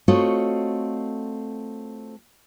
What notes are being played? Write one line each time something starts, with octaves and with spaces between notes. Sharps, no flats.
A3 C4 F4 F#4 C#5 D#5